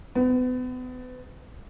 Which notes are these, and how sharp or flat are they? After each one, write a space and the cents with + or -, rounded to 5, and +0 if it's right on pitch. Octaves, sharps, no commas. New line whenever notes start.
B3 +35